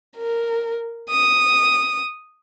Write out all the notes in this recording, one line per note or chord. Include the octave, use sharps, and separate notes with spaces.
A#4
D#6